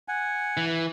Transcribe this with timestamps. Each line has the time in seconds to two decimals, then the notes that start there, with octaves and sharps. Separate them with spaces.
0.08 F#5 G#5
0.57 E3